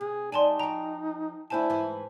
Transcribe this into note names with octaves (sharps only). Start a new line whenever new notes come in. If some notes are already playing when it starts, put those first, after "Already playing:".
C3 G#4
G3 D#4 D5 G#5 A5 C6
F3 F#4 G5 A#5
D2 D3 E4 F#4 C5 G#5 A5
G#2 E3